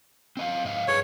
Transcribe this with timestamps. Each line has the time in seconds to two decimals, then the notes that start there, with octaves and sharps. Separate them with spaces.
0.37 C4 D#5 F5
0.65 G#2 D#5 F5
0.88 G2 G#4 B4 C#5